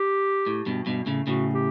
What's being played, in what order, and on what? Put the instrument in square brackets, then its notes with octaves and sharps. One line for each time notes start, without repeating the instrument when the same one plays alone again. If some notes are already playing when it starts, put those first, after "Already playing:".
Already playing: [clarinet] G4
[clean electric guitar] A2
G2 B2
G2 B2
A2 C#3
[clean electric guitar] A2 C#3 [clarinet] F#4
[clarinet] G4